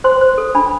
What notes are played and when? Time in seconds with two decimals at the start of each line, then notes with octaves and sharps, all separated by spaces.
0.04 C5 C6
0.21 C5
0.38 A4
0.55 D4 B5